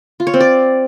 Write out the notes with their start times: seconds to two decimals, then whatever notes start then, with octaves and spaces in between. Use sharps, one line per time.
0.20 F4
0.27 C#5
0.34 C4
0.40 D5